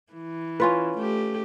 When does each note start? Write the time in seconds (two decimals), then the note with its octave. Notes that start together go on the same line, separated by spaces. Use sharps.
0.13 E3
0.60 C#4 F4 B4
0.98 A3 G4